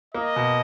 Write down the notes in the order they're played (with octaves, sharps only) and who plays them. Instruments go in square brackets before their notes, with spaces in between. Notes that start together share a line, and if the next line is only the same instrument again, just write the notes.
[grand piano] A#3 [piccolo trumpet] D#5
[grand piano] B2